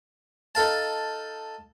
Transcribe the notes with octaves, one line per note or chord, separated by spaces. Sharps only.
D#4 A4 F5 A5